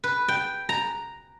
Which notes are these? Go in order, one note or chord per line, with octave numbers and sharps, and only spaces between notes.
B4
G5
A#5